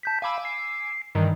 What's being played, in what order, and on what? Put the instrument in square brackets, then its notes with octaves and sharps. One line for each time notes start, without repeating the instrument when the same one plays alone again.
[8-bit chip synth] A5 G6 B6
[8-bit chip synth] F5 B5 [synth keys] G#5 D6 E6
[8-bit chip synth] C7
[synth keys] G2 D#3 E3